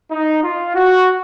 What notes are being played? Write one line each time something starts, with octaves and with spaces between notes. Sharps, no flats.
D#4
F4
F#4